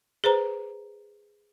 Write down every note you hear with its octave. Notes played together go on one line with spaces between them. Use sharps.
G#4 B4 C5 A#5